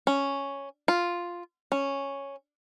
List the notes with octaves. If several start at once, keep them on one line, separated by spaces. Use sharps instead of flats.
C#4
F4
C#4